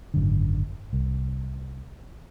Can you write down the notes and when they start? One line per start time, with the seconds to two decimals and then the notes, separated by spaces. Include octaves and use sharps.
0.14 G#1 F#2 D3
0.93 C2